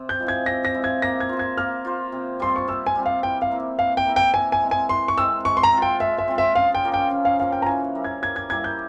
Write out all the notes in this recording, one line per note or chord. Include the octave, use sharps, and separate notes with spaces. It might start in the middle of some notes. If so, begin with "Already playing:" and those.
Already playing: C3 C4
G6
F3 G#3 E4
G#6
C3 A#6
A#6
F3 G#3 E4
G#6
A#3 A#6
G#6
F4 C5
G#6
A#3 F6
F4 C5
C3
G3 C4 F4 C6
C#6
C3 E6
G#5
G3 C4 F4
F5
E3 G5
F5
A#3 E4
E3 F5
G5
A#3 E4
G5
E3 G#5
G#5
G#3 C4
G#5
E3 C6
C#6
G#3 C4 E6
G#3 C#6
C6
A#5
C4 F4
G5
G#3 E5
E5
C4 F4
E5
C#3 F5
G5
F3 A#3 C#4
G5
C#3
F5
F3 A#3 C#4 F5
G5
A#5
E3 G#5
G3 A#3 E4
G#6
E3 G#6
G#6
G3 A#3 E4 G#6
G6